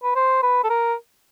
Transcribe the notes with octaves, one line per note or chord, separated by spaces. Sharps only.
B4
C5
B4
A4
A#4